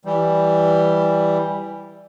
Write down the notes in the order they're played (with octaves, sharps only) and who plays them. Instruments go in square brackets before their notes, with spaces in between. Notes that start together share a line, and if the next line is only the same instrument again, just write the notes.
[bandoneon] E3 G3